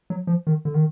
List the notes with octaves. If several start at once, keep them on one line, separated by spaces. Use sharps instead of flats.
F#3
F3
D#3
D3
D#3